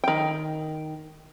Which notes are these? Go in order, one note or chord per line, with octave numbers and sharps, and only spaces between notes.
D#3 G5